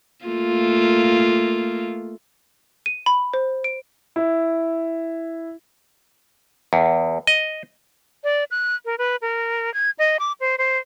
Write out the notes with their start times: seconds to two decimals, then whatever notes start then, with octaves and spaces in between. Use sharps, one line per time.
0.25 A3 A#3 F4
2.86 D#7
3.06 B5
3.34 C5
3.64 D7
4.16 E4
6.73 E2
7.27 D#5
8.24 D5
8.51 F#6
8.85 A#4
8.98 B4
9.22 A#4
9.74 G#6
9.99 D#5
10.19 D6
10.40 C5
10.58 C5